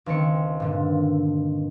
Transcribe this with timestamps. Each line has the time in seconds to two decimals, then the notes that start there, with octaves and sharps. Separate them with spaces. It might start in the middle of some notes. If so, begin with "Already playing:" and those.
0.06 C#2 D#3 C4 C#7
0.60 G2 A#2 D3